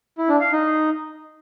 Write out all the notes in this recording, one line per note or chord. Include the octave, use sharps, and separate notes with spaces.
E4
D4
F5
D#4